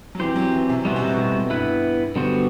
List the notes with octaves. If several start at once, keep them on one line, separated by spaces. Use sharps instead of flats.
F#3
E3 C4 G4 C5
F#3
E3
C3
B2 G3 B3 F#4 C5
C3
B2
A2
G2 B3 E4 B4
D3 G3 B3 F#4 C5